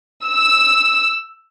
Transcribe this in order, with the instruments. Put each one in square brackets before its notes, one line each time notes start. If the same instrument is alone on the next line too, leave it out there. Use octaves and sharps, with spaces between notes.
[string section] E6